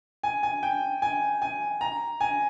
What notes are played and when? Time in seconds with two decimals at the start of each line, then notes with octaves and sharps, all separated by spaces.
0.23 G#5
0.43 G#5
0.63 G5
1.02 G#5
1.42 G#5
1.81 A#5
2.20 G#5